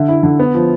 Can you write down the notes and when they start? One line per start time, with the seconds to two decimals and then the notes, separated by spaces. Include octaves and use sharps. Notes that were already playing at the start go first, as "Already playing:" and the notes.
Already playing: D3 E5
0.08 E4
0.23 D3
0.39 B3
0.54 F3